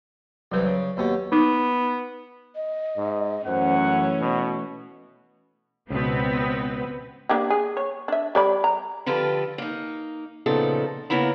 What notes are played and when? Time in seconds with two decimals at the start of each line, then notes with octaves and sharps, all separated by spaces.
0.52 C2 E3 F#3 B4
0.65 C#3
0.97 D#2 B2 C#4
1.32 B3 D#4
2.55 D#5
2.97 G#2
3.46 F#2 E3 A3 C#4 C5 F#5
3.90 C#5
4.21 B2
5.90 C#2 B2 B3 C4 B4
7.29 A#3 D4 G4
7.50 G#4
7.77 C#5
8.08 D4 E5
8.35 G3 D5 B5
8.64 A#5
9.06 D3 F3 F4 G4 A4 B4
9.58 A#3 D#4
10.46 A#2 C#3 F3 B3 D#4 A4
11.10 C#3 A#3 B3 E4 A#5